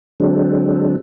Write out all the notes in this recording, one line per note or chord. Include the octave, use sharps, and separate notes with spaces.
D3 F#3 G#3 C4 D4